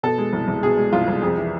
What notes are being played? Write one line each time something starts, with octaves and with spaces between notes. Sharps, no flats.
B2 A4
G#3
C2
C2
B2 G#4
G#3
C2 F4
C2
F2 G#4
E3